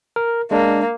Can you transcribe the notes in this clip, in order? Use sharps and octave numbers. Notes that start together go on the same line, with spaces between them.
A#4
G#3 A#3 D4